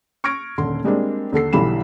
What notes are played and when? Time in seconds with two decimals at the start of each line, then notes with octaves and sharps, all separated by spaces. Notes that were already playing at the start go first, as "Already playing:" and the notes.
0.24 C#6 F6 G#6 A#6 D7
0.58 D#1 D3 C6
0.84 G3 G#3 A#3 C4 D4
1.32 D#2 D3 A4 C7
1.53 B1 D3 E3 G3 B5 E7